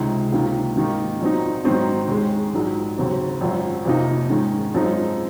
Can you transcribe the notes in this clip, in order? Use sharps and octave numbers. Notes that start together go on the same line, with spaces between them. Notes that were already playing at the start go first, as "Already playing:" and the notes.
Already playing: C#2 C3 D#3 G#3 D#4
C#2 C3 D#3 A#3
G#2 D#3 A#3 D#4
A#1 A#2 F#3 C4 D#4
G#2 D#3 F#3 C4 D#4
D#2 D#3 G#3
A#1 G#2 F#3
D#2 C#3 F#3 C4
G#1 F#2 F3
F2 C3 F3 A#3 D#4
G#2 D#3 G#3 C#4
F#2 F3 G#3 C4 D#4